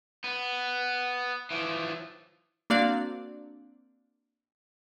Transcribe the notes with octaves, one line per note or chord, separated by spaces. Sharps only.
B3
E3 F3
A#3 C4 D4 F#4 D5 F5